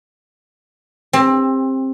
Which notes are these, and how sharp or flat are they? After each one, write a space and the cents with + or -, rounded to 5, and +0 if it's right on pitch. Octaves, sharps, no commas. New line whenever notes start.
C4 +20 G4 +35